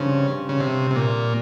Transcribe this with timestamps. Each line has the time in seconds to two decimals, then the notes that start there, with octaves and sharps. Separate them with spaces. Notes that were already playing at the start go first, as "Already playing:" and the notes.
Already playing: G2 C#3 F3 C4
0.49 C#3
0.61 C3
0.91 C3
0.96 A#2